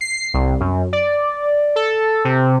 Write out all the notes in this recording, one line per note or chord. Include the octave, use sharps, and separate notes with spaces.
C7
C2
F#2
D5
A4
C3